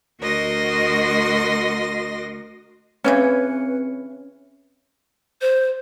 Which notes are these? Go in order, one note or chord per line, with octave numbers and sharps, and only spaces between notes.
D2 F#4 A#4 D#5 C6 A#6
C#3 E3 C4 C#4 B4 C#5 C#7
C5